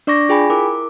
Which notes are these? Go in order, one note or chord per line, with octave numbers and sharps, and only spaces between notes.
D4 D5 C#6 D6 A#6
F4 G#4 G5 G#5 B5
E4 A#4 D6